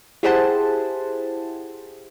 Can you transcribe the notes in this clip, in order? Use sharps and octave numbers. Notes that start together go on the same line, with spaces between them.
E4 G4 G#4 C5 F#5 A5